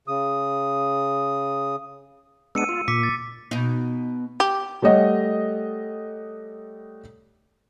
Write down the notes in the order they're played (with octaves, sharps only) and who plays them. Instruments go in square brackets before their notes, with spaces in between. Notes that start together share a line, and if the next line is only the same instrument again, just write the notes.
[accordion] C#3 D#6
[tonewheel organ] G#3 B3 D4 [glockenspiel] E6 C#7 D#7
[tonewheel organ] F4
[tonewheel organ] A#2 [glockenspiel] D6 B6 C#7
[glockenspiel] A6
[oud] B2 D#4
[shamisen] G4
[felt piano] G3 A3 C#5 D#5 F#5